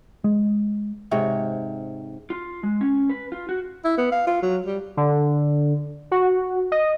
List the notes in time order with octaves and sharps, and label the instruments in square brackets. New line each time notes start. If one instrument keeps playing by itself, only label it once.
[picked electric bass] G#3
[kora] G#2 C3 C#5 G5
[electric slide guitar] F4
G#3
C#4
B4
F4
F#4
[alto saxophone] E4
B3
F5
F4
F#3
G3
[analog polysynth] D3
F#4
D#5